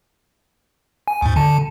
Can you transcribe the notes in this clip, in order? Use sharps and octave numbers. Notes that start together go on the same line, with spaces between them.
G#5
D2 G#2
D3 A5